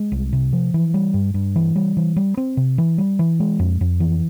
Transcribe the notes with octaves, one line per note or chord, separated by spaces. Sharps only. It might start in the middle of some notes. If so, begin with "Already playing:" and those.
Already playing: G#3
C2
C3
F3
E3
G3
G2
G2
E3
G3
E3
G3
C4
C3
E3
G3
E3
G#3
F2
F2
E3